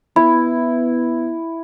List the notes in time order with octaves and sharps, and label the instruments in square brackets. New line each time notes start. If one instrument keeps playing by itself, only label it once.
[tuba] B3 [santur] E4 [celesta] B5